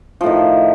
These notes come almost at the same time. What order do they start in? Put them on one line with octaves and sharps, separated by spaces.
F3 A2 D#3